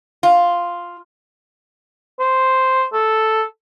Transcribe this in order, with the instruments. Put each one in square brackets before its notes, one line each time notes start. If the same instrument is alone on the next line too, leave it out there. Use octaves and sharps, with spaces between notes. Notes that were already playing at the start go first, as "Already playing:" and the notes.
[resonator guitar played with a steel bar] F4
[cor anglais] C5
A4